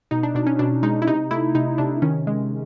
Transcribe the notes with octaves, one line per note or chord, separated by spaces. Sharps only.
B2 D#4
D4
B2 D4
C#4
B2 D4
G#3 D#4
E4
C3 D#4
A3 E4
C3 D#4
C3 D4
D#3 C#4
G#3